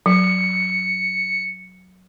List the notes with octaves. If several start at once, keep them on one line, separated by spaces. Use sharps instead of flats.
F#3 C#7